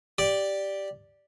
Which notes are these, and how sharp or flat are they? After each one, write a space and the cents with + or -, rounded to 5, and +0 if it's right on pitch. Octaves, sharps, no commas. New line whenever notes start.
G4 +0 D5 +0 D6 +0